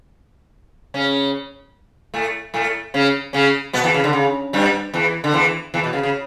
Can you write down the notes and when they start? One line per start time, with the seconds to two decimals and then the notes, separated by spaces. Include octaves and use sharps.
0.94 C#3 C#4
2.14 A2 A3
2.54 A2 A3
2.94 C#3 C#4
3.33 C#3 C#4
3.73 B2 B3
3.84 E2 E3
3.94 C#3
4.04 D3
4.13 C#3
4.53 G2 G3
4.94 E2 E3
5.24 D3
5.34 E2 E3
5.74 E2 E3
5.84 B2
5.93 C#3
6.03 C#3